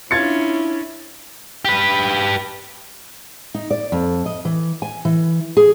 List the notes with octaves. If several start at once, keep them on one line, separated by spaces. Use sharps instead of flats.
C#4 D4 E4 F4 G#6 A6 C#7
G4 B4
D#4
D5
F2
D#5
E3
G#5
E3
G#4